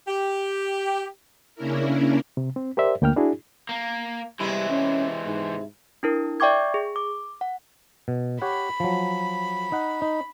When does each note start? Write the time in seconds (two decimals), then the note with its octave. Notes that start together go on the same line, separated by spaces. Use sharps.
0.08 G4
1.55 C#3 A#3 C#4 D4 E4 A#4
2.37 C3
2.56 C4
2.77 G4 A#4 C5 D5 E5
3.02 D2 A#3 G5 F6
3.16 D4 E4 F#4 G#4
3.69 A#3
4.40 C3 E3 G3 G#3 E4
4.70 C#4
5.26 G#2
6.03 D4 E4 A#4
6.40 D5 E5 G5 C#6 D6 G#6
6.74 G#4
6.96 D6
7.41 F#5
8.08 B2
8.42 G4 C#5 F#5 B5
8.80 F3 F#3
9.72 D#4 F#5
10.02 D#4